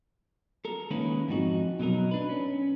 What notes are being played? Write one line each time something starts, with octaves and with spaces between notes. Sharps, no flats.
A4 A#4
D#3 G#3 A#3 C#4 E4 B4
F2 G#2 D#4 F#4
B2 F#3 D#4 A#4
D4 B4
C#4